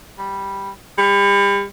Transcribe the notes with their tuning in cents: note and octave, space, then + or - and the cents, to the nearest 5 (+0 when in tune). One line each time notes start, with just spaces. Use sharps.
G3 +0
G3 +35